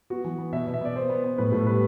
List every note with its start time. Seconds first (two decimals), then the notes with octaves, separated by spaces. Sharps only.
0.10 B3 F#4
0.24 E3
0.39 B3
0.52 B2 E5
0.67 B2
0.74 E5
0.81 B3 D5
0.96 B3 C5
1.10 B3
1.24 B3
1.38 A2 B4
1.52 A2 A4
1.67 G3 B4